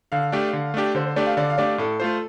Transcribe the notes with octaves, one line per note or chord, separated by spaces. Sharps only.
D3 F5
A3 D4 G4
D3
A3 D4 G4
D3 C5
C5
A3 D4 G4 D5
F5
D3 D5
F5
A3 D4 G4 D5
A2 A4
A3 F4 C5